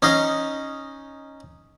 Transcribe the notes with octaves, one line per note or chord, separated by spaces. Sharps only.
C#4 D#4 D#5 F5